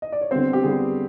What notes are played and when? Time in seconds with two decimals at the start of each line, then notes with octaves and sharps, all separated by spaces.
0.02 D#5
0.12 D5
0.21 C#5
0.31 D3 G3 B3 C4 C5
0.53 G4
0.63 D3 G3 B3 G#4